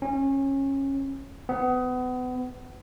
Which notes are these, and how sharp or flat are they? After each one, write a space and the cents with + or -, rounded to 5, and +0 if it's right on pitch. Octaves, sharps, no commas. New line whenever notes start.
C#4 -20
B3 +30